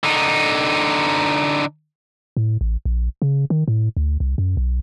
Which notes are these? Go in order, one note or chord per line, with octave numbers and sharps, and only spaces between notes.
D3 D#4
A2
A1
A#1
C#3
D#3
A2
D2
C2
F#2
B1